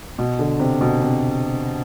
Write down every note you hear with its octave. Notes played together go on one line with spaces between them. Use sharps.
B2
D3
C3
B2
C3